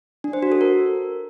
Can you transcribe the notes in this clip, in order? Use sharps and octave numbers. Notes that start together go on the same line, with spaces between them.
D4
C5
F#4
A4
A#4